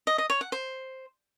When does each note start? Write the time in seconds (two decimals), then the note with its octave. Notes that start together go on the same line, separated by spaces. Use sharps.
0.07 D#5
0.18 D#5
0.30 C#5
0.41 F#5
0.52 C5